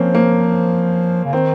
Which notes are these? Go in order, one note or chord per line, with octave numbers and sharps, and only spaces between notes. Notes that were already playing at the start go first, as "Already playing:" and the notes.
Already playing: F3 A#3 C4 C#4
A#3
C#3
D#3 C4